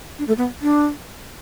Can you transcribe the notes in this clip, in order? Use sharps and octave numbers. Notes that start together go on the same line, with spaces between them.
D4
A3
B3
D4